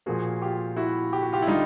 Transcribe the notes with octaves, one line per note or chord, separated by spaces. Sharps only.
A#2 F3 A#3 F#4 G#4
F4 G4
E4 F#4
G4
F#4
F4 G4
E4
D3 G3 D#4 F4